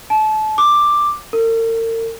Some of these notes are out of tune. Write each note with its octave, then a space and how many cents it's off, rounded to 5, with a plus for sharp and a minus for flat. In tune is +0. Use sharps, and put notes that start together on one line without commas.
A5 -30
D6 +5
A#4 -45